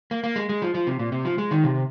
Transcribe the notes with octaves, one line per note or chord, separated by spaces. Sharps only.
A#3
A#3
G#3
G#3
F3
F3
C3
A#2
C3
F3
G#3
D#3
C3